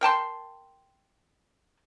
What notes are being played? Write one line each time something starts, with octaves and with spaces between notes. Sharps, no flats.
A#4 G5 A5 C6